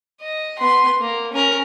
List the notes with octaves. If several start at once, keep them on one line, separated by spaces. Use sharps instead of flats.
D#5
B3 C6
A#3
C#4 A#4